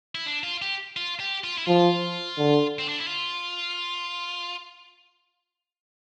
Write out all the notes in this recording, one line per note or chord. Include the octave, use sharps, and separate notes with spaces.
E4
D4
F4
G4
F4
G4
F4
E4
F3 F4
D3
C4
D4
E4
F4